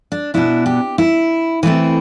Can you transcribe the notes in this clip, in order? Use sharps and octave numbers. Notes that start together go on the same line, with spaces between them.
D4
B2 B3 D4 E4
G4
E4
E3 A3 C4 E4